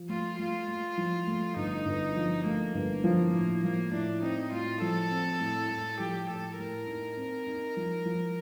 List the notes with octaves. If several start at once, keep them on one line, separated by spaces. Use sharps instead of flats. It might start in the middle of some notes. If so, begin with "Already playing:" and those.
Already playing: F3
A3 F4
A3 F4
A3
F3
A3
G1 D#4
G1
F3
A3 A#3
G1
F3
A2 A#3
F3 A#3
A2 D4
C4 D#4
A2 F4
F3 A4
C4
A2
A2
F3 G4
A2 A4
A2 A#4
D#4
C4
D#4
F3
F3